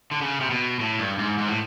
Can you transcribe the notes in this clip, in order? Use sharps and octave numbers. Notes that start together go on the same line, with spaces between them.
D3
C#3
C3
B2
A2
G2
G#2
G#2
A2